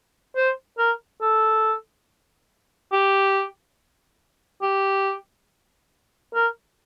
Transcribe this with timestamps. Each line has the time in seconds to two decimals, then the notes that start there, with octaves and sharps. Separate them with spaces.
0.36 C5
0.78 A#4
1.22 A4
2.92 G4
4.62 G4
6.34 A#4